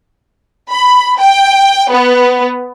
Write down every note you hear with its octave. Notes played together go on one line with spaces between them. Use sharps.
B5
G5
B3